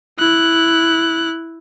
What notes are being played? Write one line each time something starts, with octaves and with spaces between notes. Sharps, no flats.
E4 F#6